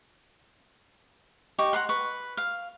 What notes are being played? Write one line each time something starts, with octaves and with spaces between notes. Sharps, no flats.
D#4 G4 C#6 D6
F#5 A#5 C6
B4 C#6
F5